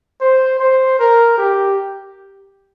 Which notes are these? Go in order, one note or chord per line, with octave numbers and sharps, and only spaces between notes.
C5
C5
A#4
G4